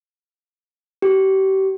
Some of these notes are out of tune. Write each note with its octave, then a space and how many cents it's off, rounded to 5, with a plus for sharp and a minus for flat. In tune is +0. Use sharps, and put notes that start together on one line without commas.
G4 -35